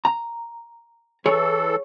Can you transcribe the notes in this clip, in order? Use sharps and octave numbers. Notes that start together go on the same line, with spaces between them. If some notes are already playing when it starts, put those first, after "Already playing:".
A#5
E3 G#4 A4 C#5